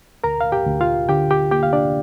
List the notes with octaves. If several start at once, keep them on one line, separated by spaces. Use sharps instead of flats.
D2 A#4 A#5
F5
G4 G5
D2
F4 F5
D3 G4 G5
G4 G5
A#3 G4 G5
F5
D4 D5